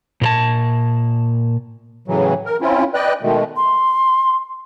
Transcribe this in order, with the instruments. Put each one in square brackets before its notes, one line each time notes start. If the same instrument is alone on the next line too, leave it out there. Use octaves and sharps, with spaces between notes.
[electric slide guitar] A#2 A#4 A5
[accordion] A2 C#3 E3 F#3
A#4
C4 C#4 E4 F4
B4 D5 D#5 G5 F#6
B2 D#3 G#3 A3
[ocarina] C6